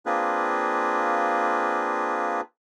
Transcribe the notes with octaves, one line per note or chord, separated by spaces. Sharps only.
A#3 C4 D4 F4 G#4 B4